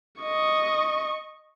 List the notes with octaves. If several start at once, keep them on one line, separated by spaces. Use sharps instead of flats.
D#5 C#6